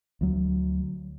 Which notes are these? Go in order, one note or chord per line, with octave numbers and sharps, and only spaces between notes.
D2 F#3